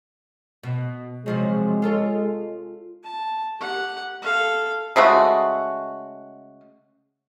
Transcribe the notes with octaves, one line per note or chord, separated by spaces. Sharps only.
B2
C3 F3 F#3 G#3
F4 A4 C#5
A5
G4 F#5
A4 F5
C#3 G#3 A3 F#4